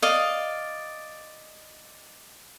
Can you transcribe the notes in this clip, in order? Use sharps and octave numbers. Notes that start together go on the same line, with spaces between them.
D5 D#5 F5